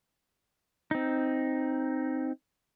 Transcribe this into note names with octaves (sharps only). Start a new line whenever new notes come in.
C4 D#4